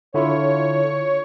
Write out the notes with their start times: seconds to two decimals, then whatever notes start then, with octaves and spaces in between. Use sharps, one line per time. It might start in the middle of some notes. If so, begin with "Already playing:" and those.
0.14 D3 E4 F4 C#5